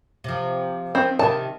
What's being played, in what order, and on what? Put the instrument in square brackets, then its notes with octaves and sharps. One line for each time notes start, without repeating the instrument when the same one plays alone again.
[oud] C3 F3
[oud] D#3 [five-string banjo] C4
[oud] C3 D#3 [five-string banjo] A5